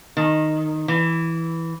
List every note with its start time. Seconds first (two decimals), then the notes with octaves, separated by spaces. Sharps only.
0.17 D#3
0.88 E3